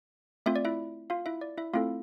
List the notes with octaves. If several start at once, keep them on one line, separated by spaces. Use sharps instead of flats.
A3 C4 F4 E5
D5
E4 E5
F4 F5
E4 E5
D5
E4 E5
A3 C4 E4 F4 A4 F5